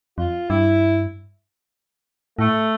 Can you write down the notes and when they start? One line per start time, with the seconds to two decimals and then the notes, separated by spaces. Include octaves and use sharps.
0.18 F2 F4
0.49 G2 E4
2.39 A2 A3